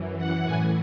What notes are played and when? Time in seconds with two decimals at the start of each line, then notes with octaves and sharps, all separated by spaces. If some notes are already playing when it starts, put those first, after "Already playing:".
Already playing: F#2 E3
0.18 F#5
0.45 A2 G#5
0.49 E3